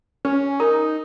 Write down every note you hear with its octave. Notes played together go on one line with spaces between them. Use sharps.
C#4 B4
D#4 A#4